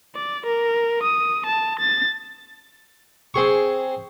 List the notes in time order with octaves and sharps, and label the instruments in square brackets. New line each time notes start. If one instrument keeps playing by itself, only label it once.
[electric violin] D5
A#4
D#6
A5
A6
[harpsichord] C4 G#4 C#6